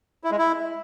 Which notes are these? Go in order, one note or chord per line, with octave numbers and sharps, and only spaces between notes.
E4
G#3
E4